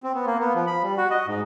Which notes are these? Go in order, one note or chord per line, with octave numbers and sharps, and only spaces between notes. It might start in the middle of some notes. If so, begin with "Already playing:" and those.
C4
B3
A#3
B3
F3
B5
G3
F#4
D#5
G#2